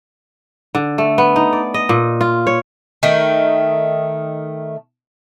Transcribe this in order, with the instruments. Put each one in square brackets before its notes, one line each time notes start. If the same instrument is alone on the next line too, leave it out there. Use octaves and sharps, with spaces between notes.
[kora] D3
A3
B3
D#4
D5
D#5
A#2
F4
C#5
[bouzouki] D#3 A3